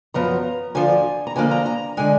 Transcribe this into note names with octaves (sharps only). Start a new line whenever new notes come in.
F#2 F3 B3 A#5
D2 D3 F3 G#5
A#5
D3 F3 A#3 D#4 G#5
A#5
A#5
D3 G#3 G#5